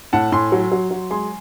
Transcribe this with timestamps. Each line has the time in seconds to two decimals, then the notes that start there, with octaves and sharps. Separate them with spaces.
0.13 A2 F#5 A5
0.32 A2 G#5 C6
0.52 F#3
0.72 F#3
0.91 F#3
1.11 G#3 G#5 C6